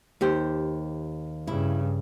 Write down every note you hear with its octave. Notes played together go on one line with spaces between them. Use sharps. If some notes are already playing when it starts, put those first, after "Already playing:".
D#2 G4 C5
G2 C#3 E4